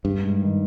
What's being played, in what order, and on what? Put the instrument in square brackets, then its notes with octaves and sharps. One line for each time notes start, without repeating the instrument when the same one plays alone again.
[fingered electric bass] G2 [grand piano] G3
[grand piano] G#2
D#3